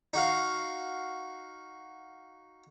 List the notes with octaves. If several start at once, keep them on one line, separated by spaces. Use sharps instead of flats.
D#4 F#4 F5